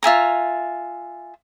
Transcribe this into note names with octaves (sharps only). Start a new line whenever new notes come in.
F4 E5 G#5 A#5